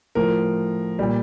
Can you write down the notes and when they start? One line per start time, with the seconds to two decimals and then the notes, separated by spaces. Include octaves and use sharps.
0.15 A2 F3 A#4
0.99 A#2 G3